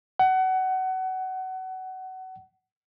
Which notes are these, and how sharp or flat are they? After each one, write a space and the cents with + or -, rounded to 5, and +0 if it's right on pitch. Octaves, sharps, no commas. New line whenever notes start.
F#5 +25